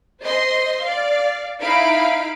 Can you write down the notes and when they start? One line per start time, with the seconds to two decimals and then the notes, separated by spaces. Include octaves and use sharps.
0.23 C5 D#5 C6
0.82 D5 F5
1.61 D#4 E4 F5 B5 D7